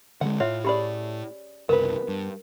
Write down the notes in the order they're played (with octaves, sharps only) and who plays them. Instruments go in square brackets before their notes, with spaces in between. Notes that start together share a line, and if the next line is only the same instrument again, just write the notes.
[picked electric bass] D3 G3 G#3 [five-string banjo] F#5
[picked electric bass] A2 [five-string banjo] F4 [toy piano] C#5 E5
[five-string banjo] C#4 G#4 D5 [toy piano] G4 B5
[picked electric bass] F#1 C2 [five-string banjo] B3 B4 [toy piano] A#4
[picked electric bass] G2